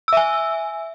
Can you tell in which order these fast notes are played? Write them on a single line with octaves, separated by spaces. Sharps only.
E6 E5 G#5